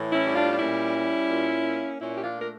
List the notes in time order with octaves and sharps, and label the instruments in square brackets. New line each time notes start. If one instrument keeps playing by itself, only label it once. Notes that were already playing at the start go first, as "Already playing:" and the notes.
Already playing: [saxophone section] A2 E3
C#4 E4
G3
D4 F4
D4
A#2 C#4 E4
G3
A#2
A#3
A#2 C#4 E4
G4
D4 F4
A3
A#4